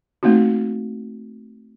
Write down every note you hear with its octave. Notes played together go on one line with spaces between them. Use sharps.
A3 A#3 C4 D#4 F#4